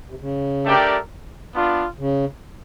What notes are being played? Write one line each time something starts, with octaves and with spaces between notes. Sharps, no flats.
C3
C#3
A3 D4 G4 A#4 D5
B3 D4 F4
C#3